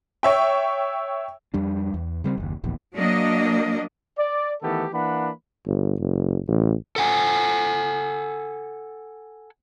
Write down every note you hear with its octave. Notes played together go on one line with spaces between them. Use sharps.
C#5 E5 G5
F2 G3 D4
E2
C#3 G3 A3 C4
F#1 D#2
D1 A#1 E2
F#3 A#3 D4 D#5
D5
D#3 E3 A3 B3 G4 A4
E3 A#3 D4 F#5 B5
G1
F#1
A1
A4 F#5 G#5